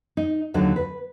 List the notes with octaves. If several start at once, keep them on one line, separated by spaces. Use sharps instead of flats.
D#4
D#2 D3 F#3 D#4
B4